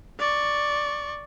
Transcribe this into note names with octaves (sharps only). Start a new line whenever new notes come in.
D5 C#6